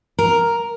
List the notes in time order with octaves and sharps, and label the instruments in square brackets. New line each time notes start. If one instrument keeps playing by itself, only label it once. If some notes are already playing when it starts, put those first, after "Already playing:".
[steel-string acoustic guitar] A#4